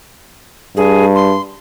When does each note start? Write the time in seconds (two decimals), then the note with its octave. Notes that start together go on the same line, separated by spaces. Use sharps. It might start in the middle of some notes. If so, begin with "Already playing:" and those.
0.77 G2 G#4
1.15 C6